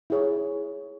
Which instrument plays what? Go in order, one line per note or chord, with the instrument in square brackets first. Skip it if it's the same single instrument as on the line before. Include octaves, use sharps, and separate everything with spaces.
[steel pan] E4 G#4 C#5